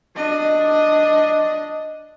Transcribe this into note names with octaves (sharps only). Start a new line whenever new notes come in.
D4 D#5